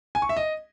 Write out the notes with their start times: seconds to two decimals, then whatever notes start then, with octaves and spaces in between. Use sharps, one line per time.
0.15 G#5
0.22 C#6
0.29 E5
0.37 D#5